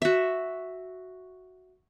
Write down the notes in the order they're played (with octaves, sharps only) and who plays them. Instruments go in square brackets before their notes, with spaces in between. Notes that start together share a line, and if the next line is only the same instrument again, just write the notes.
[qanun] F#4 E5